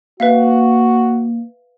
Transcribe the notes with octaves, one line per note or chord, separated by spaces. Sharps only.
A#3 F#4 B4 E5 F5